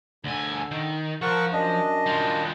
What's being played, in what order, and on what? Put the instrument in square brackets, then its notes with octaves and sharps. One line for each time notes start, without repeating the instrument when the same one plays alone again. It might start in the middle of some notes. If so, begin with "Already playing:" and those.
[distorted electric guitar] D2 G#5 [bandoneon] D3
[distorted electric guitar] D#3
[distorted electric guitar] F3 [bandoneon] A#4 F#5 C#6
[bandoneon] F#2 D4 D#5
[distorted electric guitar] G3 F4